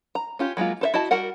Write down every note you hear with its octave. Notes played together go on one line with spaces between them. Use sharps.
A#5
C#4 F4 G4
F#3 G#3 A#3 F4
A4 C5 E5
E4 F#4 D#5 A5
G3 F#4 A#4 F#5